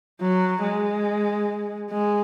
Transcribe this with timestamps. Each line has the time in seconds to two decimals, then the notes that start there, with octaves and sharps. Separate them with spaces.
0.21 F#3
0.63 G#3
1.91 G#3